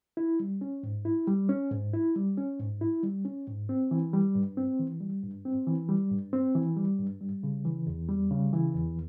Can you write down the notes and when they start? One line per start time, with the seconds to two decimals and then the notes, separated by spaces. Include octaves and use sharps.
0.17 E4
0.40 G3
0.61 C#4
0.83 G#2
1.05 E4
1.27 G3
1.49 C#4
1.71 G#2
1.93 E4
2.15 G3
2.37 C#4
2.59 G#2
2.81 E4
3.03 G3
3.25 C#4
3.47 G#2
3.69 C4
3.91 E3
4.13 G3
4.35 G2
4.57 C4
4.80 E3
5.01 G3
5.23 G2
5.45 C4
5.67 E3
5.89 G3
6.11 G2
6.33 C4
6.55 E3
6.77 G3
6.99 G2
7.21 G3
7.43 C#3
7.65 E3
7.87 E2
8.09 G3
8.31 C#3
8.53 E3
8.75 E2